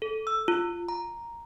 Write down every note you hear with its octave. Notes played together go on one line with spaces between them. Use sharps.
A4
E6
F4
A#5